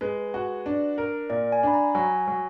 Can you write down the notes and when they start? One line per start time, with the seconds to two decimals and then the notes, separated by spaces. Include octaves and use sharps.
0.01 G#3 B4
0.34 F#4
0.66 D4
0.98 A#4
1.30 A#2 D5
1.52 G#5
1.63 D4 B5
1.73 A#5
1.95 F#3 G#5
2.28 F#3